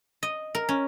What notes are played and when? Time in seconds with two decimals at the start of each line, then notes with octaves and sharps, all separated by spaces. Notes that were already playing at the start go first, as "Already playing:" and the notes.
0.23 D#5
0.55 A#4
0.69 C#4